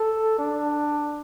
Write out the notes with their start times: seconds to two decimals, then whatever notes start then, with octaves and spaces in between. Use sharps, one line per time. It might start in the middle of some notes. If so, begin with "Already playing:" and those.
Already playing: A4
0.38 D4